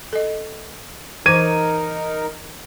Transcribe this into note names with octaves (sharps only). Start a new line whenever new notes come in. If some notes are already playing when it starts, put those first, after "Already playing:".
A4 D#5
E3 D#4 A#4 C5 D6 G#6 D#7